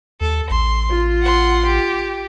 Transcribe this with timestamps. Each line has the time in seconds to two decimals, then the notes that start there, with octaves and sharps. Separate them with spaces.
0.21 D#2 A4
0.50 A1 C6
0.90 F4
1.21 F#5 C6
1.66 G4